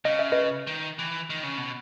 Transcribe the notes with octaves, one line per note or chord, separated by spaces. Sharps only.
C#3 D#5
E5
B4 D#5
D#3
E3
D#3
C#3
B2